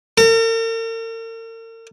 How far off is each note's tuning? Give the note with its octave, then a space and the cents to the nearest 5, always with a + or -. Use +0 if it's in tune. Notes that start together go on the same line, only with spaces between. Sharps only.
A#4 -45